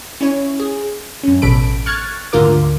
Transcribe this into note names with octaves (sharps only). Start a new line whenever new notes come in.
C#4 E4 C#5
G#4
F#2 C#4
A1 B2 A4 B5 D7
C#6 F6 F#6 G#6 A6 C#7
D2 G#2 D3 F4 A#4 D6